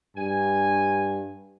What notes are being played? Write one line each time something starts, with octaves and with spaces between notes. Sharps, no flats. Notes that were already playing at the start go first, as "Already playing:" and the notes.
G2 G#5